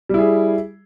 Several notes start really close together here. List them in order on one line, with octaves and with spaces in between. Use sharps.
G3 E4 G#4